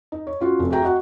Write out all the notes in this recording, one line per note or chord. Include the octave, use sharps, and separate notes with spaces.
D#4
C#5
C#4 F4 F#4
F1
F#4 G#4 E5 G5 A#5
F#4 D#5 F#5